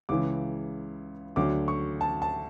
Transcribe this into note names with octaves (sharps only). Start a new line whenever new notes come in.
C#2 C#3 E3 D6
D2 D3 F#3 D6
C#6
A5
A5